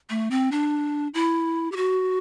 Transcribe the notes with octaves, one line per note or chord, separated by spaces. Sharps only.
A3
C4
D4
E4
G4
F#4